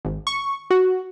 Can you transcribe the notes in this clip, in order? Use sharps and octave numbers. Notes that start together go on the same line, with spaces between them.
G#1
C#6
F#4